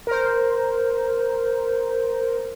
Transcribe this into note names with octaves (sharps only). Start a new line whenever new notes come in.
A#4 C5